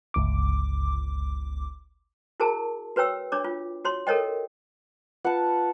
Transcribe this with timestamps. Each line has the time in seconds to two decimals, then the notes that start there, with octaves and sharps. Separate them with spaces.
0.14 G1 C#2 D6
2.40 E4 F#4 G#4 A#4 A5
2.96 F#4 B4 C#5 G5 E6
3.32 D4 C#5 D6
3.44 F4
3.85 F#4 C#5 C6
4.07 A4 A#4 C#5 D#5 G5
5.25 F4 B4 F#5 A5